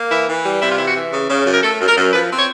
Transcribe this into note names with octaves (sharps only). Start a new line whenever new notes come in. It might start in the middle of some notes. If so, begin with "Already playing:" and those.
Already playing: A#3
E3 E4
E3
G3
C3 E4
F4
E3 E4
F#4
E3
C#3
C#3
F#2
A#4
A3 A4
F#2
A#4
F#2
F3 B4
C4
C#5